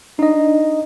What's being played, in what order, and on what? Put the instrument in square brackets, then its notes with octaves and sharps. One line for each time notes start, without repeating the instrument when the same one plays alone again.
[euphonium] D4 [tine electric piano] D#4 D#5